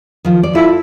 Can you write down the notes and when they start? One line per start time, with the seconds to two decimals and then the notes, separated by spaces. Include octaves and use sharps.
0.25 D#3 F3
0.43 D5
0.55 E4 F4 A4